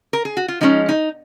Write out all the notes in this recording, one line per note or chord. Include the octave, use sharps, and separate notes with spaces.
A#4
G#4
F#4
F4
F3 G#3 C#4 D#4
D#4